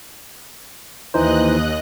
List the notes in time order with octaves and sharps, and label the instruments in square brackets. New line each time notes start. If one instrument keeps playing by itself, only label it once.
[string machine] D#2 D#5 F#6 [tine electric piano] E3 D#4 C5